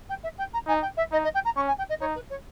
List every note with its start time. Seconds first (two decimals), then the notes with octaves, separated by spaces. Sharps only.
0.09 G5
0.23 E5
0.38 G5
0.53 A#5
0.67 D#4 G#5
0.82 G5
0.97 E5
1.12 D#4 D#5
1.24 D#5
1.34 G5
1.45 A#5
1.56 C#4 C#6
1.67 G#5
1.78 G5
1.89 D#5
2.01 D#4 C#5
2.15 B4
2.30 C#5